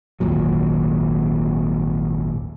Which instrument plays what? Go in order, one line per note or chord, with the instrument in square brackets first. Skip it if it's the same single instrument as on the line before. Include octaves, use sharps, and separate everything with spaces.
[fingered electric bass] G#1 D#2 A#2 F#3